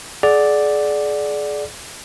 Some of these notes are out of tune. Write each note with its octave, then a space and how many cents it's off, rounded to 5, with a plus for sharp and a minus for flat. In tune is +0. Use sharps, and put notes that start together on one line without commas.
G#4 +35 D5 +0 F#5 +0